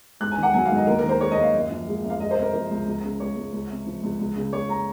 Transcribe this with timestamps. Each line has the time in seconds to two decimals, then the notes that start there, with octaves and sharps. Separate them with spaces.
0.20 G#2 F#6
0.31 G#5
0.38 D#3
0.43 F#5
0.54 F#3 G#5
0.65 F5
0.71 G#2
0.76 D#5
0.87 D#2 A#4
0.99 D#3 A#4
1.09 C5
1.20 G#3 C#5
1.31 D#5
1.37 D#2
1.42 F5
1.54 F#2
1.70 F3
1.87 G#3
2.03 F#2
2.10 F5
2.20 G#3 D#5
2.31 C5
2.37 C3
2.42 A#4
2.53 F3 A#4
2.70 C#2
2.86 C#2
3.03 C#3
3.20 G#3 C#5
3.36 C#2
3.53 C#2
3.69 C3
3.86 F3
4.03 C#2
4.20 C#2
4.36 C#3
4.52 G#3 C#5
4.69 A#5